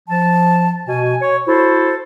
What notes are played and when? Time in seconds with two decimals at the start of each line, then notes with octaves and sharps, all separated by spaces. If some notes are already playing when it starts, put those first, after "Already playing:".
0.09 F3 A5
0.88 B2 G#5
1.21 C#5
1.47 E4 F#4 A4 C5